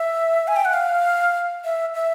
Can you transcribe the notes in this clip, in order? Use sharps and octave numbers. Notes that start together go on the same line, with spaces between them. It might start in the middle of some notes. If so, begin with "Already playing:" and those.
Already playing: E5
G#5
G5
F#5
F5
E5
E5